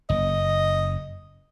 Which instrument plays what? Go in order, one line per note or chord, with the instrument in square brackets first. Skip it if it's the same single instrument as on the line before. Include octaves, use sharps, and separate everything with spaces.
[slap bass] F#1 [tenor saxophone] D#5